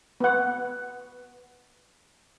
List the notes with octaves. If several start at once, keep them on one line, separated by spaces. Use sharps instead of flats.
B3 F#5